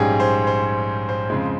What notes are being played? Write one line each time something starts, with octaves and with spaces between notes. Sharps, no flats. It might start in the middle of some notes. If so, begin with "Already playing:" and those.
Already playing: A#1 G#2 G3 C#4 G4 G#4
C5
C5
C5
F2 C#3 G#3